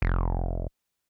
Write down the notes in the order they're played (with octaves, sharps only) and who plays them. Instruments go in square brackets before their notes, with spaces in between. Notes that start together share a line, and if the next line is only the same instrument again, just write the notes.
[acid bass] F1